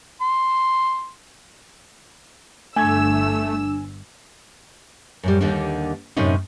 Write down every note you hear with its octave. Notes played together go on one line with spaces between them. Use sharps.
C6
G1 G2 A3 D4 G#5 E6 G#6
F#2 A2 G3
D#2 D3 D#3 G3 A#3 D4
F#2 A2 C3 C#4 D#4